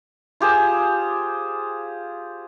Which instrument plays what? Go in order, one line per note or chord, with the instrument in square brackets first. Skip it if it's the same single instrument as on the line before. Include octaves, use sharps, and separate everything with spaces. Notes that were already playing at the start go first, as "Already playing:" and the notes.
[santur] F4 G4 G#4 C5